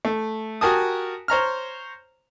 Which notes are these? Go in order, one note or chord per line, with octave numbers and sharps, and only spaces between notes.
A3
F#4 G4 A#4 G#5 A5 D#6
C5 C#5 A#5 F6